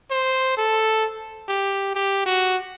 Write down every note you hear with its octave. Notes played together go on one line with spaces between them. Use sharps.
C5
A4
G4
G4
F#4